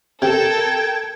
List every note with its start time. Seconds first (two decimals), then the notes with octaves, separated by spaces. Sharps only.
0.22 C3 A4 A#4 G5 G#6